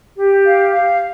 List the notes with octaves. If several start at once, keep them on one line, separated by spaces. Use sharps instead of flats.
G4
F5
F5